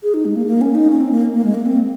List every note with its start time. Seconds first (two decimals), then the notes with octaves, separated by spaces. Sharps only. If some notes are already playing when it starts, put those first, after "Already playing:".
0.03 G#4
0.14 D#4
0.25 G#3
0.36 A#3
0.46 A#3
0.61 C#4
0.75 D#4
0.90 C#4
1.00 C4
1.11 A#3
1.33 A#3
1.44 G#3
1.54 A#3
1.66 C4